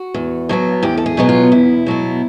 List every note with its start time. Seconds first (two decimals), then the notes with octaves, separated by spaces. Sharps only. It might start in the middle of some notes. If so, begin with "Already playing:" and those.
Already playing: F#4
0.14 E2
0.49 B2 F#3 B3
0.83 E2 G4
0.97 A4
1.06 G#4
1.17 B2 F#3 B3
1.29 F4
1.52 E2 E4
1.86 B2 F#3 B3